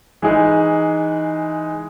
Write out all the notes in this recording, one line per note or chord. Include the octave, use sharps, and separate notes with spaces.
E3 G#3 D#4 G#4